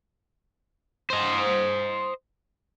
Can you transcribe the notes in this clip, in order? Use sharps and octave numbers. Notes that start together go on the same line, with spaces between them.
C5 D#5